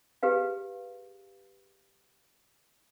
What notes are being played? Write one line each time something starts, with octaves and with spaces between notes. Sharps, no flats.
G4 G#4 B4 F5